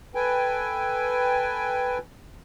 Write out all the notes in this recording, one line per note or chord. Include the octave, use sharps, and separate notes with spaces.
A4 B4 G5 G#5